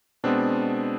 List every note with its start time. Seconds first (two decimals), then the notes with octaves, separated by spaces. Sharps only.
0.24 B2 G#3 B3 C4 D4